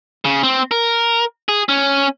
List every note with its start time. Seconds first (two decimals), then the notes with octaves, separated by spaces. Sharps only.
0.25 C#3
0.43 C4
0.71 A#4
1.48 G#4
1.69 C#4